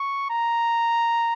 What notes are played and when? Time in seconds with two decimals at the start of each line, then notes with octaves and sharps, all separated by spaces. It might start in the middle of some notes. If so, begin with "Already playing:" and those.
Already playing: C#6
0.30 A#5